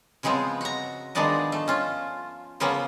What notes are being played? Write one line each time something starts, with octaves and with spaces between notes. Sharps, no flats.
C#3 F3 G#3 B3 C4
F#4 A#5
D#3 F3 G#3 B3 D4 D#5
A3
C#4 F4
C#3 F3 A#3 B3 C#4